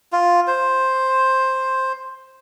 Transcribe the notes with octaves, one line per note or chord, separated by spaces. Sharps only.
F4
C5